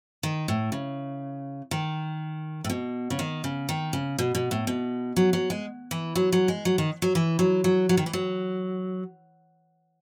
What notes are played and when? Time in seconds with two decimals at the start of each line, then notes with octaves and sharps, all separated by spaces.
0.23 D#3
0.48 A2
0.72 C#3
1.71 D#3
2.64 A2
2.70 B2
3.10 C#3
3.19 D#3
3.44 C#3
3.69 D#3
3.93 C#3
4.19 B2
4.35 B2
4.51 A2
4.67 B2
5.16 F#3
5.33 F#3
5.50 G#3
5.91 E3
6.15 F#3
6.32 F#3
6.48 G#3
6.65 F#3
6.78 D#3
7.02 F#3
7.15 E3
7.39 F#3
7.64 F#3
7.89 F#3
7.97 D#3
8.06 E3
8.13 F#3